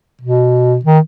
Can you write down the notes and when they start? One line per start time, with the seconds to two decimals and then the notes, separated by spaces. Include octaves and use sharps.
0.21 B2
0.85 D#3